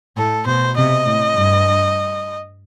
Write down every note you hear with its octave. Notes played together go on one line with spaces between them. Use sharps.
A2 A4
B2 C5
C3 D#5
A2
G2